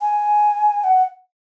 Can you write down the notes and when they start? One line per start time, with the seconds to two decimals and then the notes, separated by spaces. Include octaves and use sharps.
0.01 G#5
0.84 F#5